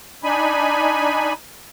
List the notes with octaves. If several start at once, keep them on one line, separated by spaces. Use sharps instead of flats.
D4 D#4 G#5 B5